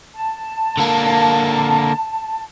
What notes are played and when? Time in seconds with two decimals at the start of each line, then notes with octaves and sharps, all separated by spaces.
0.16 A5
0.77 D3 A#3